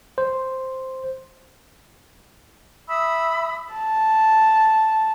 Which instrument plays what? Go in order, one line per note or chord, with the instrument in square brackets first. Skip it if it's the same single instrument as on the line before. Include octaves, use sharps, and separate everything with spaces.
[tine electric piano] C5
[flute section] E5 B5 D#6 E6
[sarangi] A5